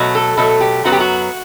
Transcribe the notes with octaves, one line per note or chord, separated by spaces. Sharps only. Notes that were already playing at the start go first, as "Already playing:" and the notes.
Already playing: B2 F#3 A3
A4
B2 F#3 A3 A4
G4
F#2 F#3 B3 F#4
G4
F#4